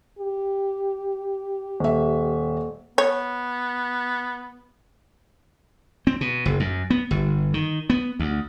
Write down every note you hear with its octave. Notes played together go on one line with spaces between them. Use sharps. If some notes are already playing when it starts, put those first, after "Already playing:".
G4
D#1 E5
B3 C#5
C4
B2
F#1
F#2
B3
G1
D#3
B3
D2